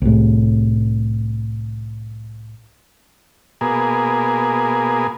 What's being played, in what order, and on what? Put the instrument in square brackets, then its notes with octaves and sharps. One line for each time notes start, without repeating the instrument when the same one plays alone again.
[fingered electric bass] C2 A2
[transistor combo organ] B2 A#3 G#4